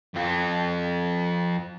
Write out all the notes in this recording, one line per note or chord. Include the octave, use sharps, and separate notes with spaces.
F2 F4